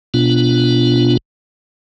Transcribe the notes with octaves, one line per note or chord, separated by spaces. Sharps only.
B2 B3 D4 F4